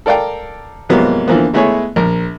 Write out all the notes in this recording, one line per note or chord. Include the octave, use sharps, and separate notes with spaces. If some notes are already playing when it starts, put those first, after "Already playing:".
A4 A#4 D5 F5 G5
G#2 C3 F3 F#3 A#3 B3
D3 E3 F3 A#3 B3
G#3 A3 B3 E4 G#4 C#5
A#1 A#4